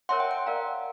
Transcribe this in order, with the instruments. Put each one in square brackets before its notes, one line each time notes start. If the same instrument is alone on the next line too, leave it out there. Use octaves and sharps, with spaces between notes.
[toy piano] A#4 C#5 E5 A5 C6 [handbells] F#5
[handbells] G5
F#5
[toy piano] A#4 D5 F5 A#5